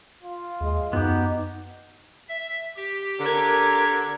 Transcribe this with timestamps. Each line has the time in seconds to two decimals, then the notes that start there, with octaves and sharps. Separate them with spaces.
0.23 F4
0.60 D#2 G#3
0.93 F#2 B3 D#4 F#4 G4
2.29 E5
2.76 G4
3.19 D3 A#4 G#6